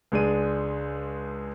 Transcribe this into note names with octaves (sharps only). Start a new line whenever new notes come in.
C#2 G#3 D4 D#7